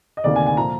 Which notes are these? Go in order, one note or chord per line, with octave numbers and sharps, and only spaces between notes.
D#5
D2 C3 D#3 A#3 D5
G#5
G#5
A#2 F3 A#5